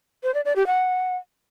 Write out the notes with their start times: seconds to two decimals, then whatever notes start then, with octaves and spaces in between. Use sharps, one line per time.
0.23 C5
0.34 D5
0.45 D5
0.56 G4
0.67 F#5